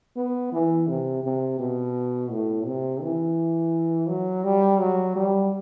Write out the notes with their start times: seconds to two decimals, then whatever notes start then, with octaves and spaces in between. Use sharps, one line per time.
0.16 B3
0.52 E3
0.88 C3
1.23 C3
1.59 B2
2.31 A2
2.66 C3
3.02 E3
4.08 F#3
4.44 G3
4.80 F#3
5.15 G3